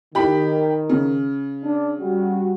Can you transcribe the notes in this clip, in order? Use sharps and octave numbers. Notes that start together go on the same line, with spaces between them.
D#3 G4 B5
C#3
D4
G3 F#4